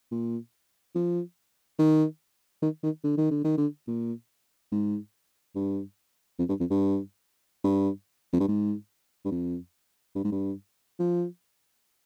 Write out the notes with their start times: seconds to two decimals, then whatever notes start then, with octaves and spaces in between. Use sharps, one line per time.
0.12 A#2
0.95 F3
1.79 D#3
2.62 D#3
2.83 D#3
3.04 D3
3.17 D#3
3.31 D3
3.44 D#3
3.58 D3
3.87 A#2
4.72 G#2
5.55 G2
6.39 F2
6.49 G2
6.60 F2
6.70 G2
7.64 G2
8.33 F2
8.40 G2
8.48 G#2
9.25 G2
9.31 F2
10.15 G2
10.24 G#2
10.32 G2
10.99 F3